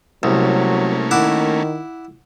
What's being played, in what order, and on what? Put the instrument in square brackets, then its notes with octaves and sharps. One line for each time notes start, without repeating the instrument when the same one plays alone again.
[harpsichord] C2 [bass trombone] F#3 [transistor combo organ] A3 A#3 C#4
[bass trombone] D#3 [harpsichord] E4 F#5 D6